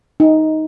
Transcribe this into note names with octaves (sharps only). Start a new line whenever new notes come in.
D#4